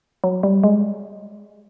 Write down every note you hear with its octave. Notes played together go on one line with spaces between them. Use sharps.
F#3
G3
G#3